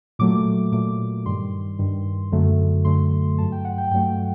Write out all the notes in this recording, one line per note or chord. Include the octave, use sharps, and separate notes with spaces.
A#2 F#3 A3 D6
A#2 F#3 A3 D6
G2 D#3 G3 C6
G2 D#3 G3
F#2 D3 F#3 A3
F#2 D3 F#3 A3 C6
G2 F#3 A3 A5
G5
F#5
G5
G2 F#3 A3 G5